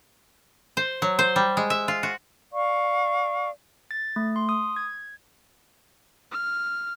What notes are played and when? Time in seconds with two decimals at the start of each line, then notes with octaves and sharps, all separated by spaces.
0.77 C5
1.02 F#3
1.19 C5
1.36 G3
1.57 G#3
1.70 E5
1.88 F4
2.03 F#4
2.53 D5 F5 C#6
3.91 A6
4.16 A3
4.36 C6
4.49 D#6
4.76 G#6
6.31 F6